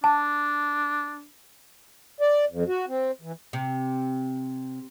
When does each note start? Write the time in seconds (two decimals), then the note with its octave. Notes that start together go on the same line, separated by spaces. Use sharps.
0.04 D4 A5
2.21 D5
2.50 F2
2.67 F#4
2.88 C4
3.22 E3
3.53 C3